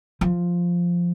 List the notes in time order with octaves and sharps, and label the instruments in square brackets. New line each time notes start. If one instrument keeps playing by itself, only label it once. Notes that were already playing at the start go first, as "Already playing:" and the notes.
[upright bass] F3